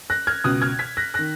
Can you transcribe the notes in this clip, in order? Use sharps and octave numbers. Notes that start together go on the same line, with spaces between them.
F#6 A#6
F6 G#6
C#2 B2 D#6 F#6
F6 G#6
G#6 B6
F#6 A#6
D#3 F#6 A#6